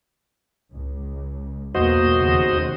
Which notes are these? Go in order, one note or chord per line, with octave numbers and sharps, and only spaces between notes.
C#2
B1 E2 A#3 F#4 C5 D#5
F1 D#2 C#3